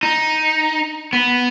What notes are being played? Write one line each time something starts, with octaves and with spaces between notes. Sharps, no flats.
D#4
B3